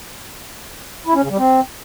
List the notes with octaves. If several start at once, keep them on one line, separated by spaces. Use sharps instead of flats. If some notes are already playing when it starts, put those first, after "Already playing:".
E4
C#4
C#3
G3
C4